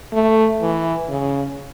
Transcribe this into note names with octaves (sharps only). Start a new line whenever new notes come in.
A3
E3
C#3